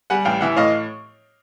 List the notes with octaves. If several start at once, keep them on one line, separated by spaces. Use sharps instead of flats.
G3 F#5 G#5
A1 F5 G5
E3 E5 F#5
A2 D#5 F5